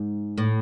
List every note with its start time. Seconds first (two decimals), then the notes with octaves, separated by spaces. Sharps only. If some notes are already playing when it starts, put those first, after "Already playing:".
Already playing: G#2
0.38 A2